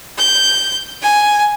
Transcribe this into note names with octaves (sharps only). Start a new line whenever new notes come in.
G6
G#5